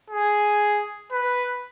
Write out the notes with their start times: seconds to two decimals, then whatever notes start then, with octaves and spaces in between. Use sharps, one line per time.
0.10 G#4
1.12 B4